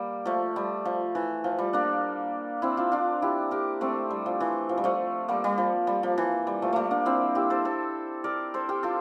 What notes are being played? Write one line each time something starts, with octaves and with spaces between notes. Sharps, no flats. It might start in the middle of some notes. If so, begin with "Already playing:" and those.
Already playing: G3 A#3
F3 A3
G3
F3
E3
F3
G3
A#3 D4
C4 E4
D4 F4
D4 F4
E4 G4
G4 A#4
A3 C4
G3
F3
E3
F3
G3
F3 A3
G3 A#3
G3
F3
G3
F3
E3
G3
F3 A3
G3 A3 A#3
A#3 D4
C4 E4
E4 G4
A4 C5
A4 C5
A#4 D5
A4 C5
G4 A#4
F4 A4